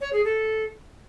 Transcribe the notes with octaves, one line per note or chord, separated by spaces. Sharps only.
C#5
G#4
A4